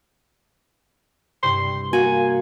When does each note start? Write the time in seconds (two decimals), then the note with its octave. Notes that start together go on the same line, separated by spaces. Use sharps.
1.43 G2 C3 E4 C6
1.93 A#3 F#4 G#5